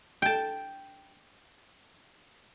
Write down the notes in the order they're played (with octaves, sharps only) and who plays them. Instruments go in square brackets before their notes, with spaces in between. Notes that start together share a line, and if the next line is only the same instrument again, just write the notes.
[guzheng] G5 A5